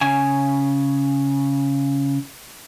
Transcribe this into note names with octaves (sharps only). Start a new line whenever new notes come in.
C#3 G#5